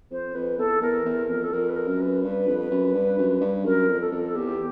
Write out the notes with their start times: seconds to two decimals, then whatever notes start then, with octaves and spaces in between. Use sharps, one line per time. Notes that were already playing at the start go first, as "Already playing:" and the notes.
0.11 F2 C5
0.34 F2 B4
0.58 E2 A4
0.82 E2 A#4
1.05 E2
1.29 F2
1.43 A4
1.52 F2 A#4
1.69 B4
1.76 A#4
1.88 F#2
2.00 B4
2.23 G2 B4
2.47 F2
2.58 B4
2.71 F#2
2.94 G2
3.18 F#2
3.41 G2
3.65 F#2 A#4
3.89 F2
4.00 A4
4.12 F2
4.35 E2 G4